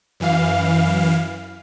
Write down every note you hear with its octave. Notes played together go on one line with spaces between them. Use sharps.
F#2 E3 F5